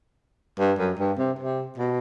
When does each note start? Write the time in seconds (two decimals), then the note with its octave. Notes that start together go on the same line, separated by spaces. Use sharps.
0.59 G2
0.79 F#2
0.99 G2
1.18 C3
1.39 C3
1.78 B2